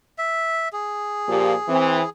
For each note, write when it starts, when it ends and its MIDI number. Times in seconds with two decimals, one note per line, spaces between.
0.18 0.68 76
0.73 2.09 68
1.28 1.53 46
1.28 1.53 53
1.28 1.53 67
1.68 2.01 52
1.68 2.01 60